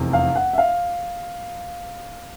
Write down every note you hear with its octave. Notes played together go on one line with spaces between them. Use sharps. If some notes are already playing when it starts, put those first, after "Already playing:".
Already playing: F1 E2 C3
F5
F#5
E5
F5